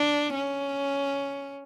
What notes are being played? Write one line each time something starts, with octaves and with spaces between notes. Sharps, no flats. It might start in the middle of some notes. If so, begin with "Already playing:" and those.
Already playing: D4
C#4